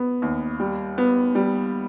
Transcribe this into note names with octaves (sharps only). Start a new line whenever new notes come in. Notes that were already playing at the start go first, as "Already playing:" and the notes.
Already playing: B3
D#2
G3
B3
G3